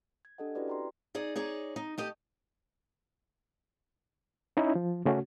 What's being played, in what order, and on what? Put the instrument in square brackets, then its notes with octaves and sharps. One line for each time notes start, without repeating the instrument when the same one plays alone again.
[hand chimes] G#6
D4 G4 A4 D#5 F#5
C#4 E4 F#4 G4 B4 D5
G5 A#5 C6
[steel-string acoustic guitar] D#4 G#4 D5
D#4 G#4 C#5 D5
D#4
A3 G4 D#5
[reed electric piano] C#4 D#4 E4
F3
C#3 A3 C#4 F#4